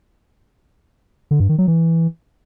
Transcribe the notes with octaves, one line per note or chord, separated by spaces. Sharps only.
D3
G2
D#3
F#3
E3